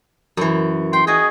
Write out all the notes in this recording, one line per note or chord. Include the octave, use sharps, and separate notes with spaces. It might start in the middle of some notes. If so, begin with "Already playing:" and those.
F#2 E3
G5 C6
F#4 G#4 D#5 G5